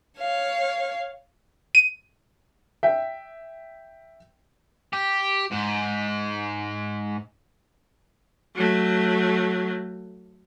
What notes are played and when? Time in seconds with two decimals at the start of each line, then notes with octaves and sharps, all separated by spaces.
0.20 C#5 F5
1.75 D#7
2.83 E5 G5
4.93 G4
5.52 G#2
8.55 F#3 A3